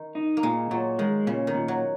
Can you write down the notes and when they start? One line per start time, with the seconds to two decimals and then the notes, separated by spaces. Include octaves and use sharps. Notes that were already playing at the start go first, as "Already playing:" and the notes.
Already playing: D#3
0.15 D#4
0.37 A#3
0.43 A#2 G#3
0.71 A#2 F#3
0.99 D#3 G#3
1.27 A#2 C#3
1.47 D#3
1.54 A#2
1.68 F#3